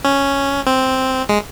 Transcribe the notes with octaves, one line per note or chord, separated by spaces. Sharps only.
C#4
C4
G#3